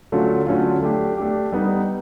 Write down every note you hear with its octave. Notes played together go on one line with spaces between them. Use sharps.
D3 F#3 A3 C#4 F4
D3 F#3 A3 C#4 F4
A3 D4 G4
A3 D4 G4
G3 B3 D#4